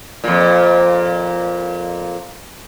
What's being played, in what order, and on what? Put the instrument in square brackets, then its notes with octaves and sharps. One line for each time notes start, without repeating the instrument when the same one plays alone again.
[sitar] F2 A#2